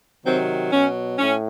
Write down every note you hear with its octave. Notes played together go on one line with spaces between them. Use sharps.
C3 D#3 F#3 C4
B2 F#3 C#4
A2 C#4